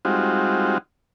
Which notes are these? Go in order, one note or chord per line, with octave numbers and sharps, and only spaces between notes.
G3 G#3 C4 D#4 F4 F#4